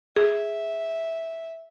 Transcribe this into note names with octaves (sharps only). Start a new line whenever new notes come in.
G#4 E5